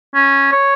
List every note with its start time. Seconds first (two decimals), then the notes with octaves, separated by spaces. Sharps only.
0.15 C#4
0.52 C#5